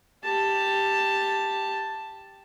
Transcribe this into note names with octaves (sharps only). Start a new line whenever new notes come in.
G4 A5